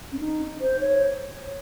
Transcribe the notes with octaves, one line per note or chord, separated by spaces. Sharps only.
C#4
D#4
C5
C#5